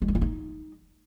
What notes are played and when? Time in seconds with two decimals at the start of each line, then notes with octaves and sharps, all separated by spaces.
0.02 G#3
0.08 C#4
0.15 E4
0.21 D#4